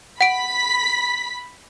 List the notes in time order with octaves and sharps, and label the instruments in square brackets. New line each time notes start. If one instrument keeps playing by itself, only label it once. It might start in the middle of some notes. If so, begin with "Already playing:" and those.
[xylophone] F#5 D7 [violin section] B5 B6